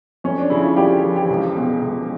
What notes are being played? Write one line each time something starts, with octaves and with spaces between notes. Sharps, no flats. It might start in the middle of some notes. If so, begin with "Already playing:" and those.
F2 C#4
D4
C#3 E4
F4
F2 G4
E3
G4
C#2
B2
C#2